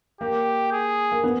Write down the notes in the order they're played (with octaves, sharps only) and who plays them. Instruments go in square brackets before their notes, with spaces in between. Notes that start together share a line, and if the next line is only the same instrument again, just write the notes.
[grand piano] A#3 [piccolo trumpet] G4
[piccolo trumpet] G#4
[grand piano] A#3
B3